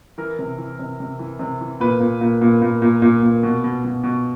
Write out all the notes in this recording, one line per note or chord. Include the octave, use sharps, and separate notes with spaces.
E3 A#4
C3
E3
C3
C3
E3
C3
E3
A#2 B4
A#2
A#2
A#2
A#2
A#2
A#2
A#2
B2
B2
B2
B2